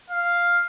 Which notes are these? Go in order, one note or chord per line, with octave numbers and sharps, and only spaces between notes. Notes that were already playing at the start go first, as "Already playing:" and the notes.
F5